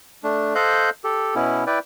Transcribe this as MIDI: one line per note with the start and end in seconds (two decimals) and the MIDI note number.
0.24 0.54 57
0.24 0.54 62
0.55 0.90 69
0.55 0.90 72
0.55 0.90 75
0.55 0.90 77
0.55 0.90 90
0.55 0.90 91
1.04 1.35 67
1.04 1.35 69
1.35 1.64 47
1.35 1.64 59
1.35 1.64 61
1.35 1.64 64
1.67 1.79 64
1.67 1.79 71
1.67 1.79 74
1.67 1.79 79